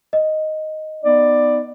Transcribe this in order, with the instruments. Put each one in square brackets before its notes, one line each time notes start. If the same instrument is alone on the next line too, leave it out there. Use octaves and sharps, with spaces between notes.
[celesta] D#5
[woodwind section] B3 D#4 D5